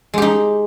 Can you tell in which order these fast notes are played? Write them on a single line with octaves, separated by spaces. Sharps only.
G#3 G4 D#4